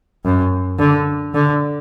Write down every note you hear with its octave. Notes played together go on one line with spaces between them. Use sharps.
F#2
D3
D3